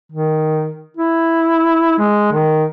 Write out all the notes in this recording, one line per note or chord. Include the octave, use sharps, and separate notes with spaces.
D#3
E4
G#3
D#3